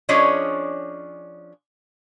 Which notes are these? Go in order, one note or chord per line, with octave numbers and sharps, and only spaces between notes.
F3 C#4 D4 G#4 C#5 D#5